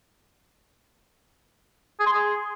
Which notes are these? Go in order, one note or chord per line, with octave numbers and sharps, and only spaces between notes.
G#4
C6
G#4